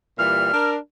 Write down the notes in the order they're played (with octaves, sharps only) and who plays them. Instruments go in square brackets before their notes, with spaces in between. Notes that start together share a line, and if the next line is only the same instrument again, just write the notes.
[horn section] A#2 E3 G3 [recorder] F6
[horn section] D4 A#4